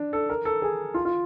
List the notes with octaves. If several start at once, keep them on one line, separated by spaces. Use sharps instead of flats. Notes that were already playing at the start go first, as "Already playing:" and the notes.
Already playing: D4
A4
A#4
A4
G#4
F4
F4